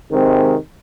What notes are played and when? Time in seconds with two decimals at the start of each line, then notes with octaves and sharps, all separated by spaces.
0.11 C3 D#3 G#3 C4